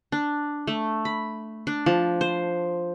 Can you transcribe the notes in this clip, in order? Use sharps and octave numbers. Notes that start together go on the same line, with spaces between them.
D4
A3
B5
D4
F3
C5